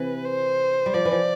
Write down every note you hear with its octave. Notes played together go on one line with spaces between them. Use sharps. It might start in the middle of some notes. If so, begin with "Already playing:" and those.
Already playing: C3 E3 B4
C5
G3
F3 D5
E3
F3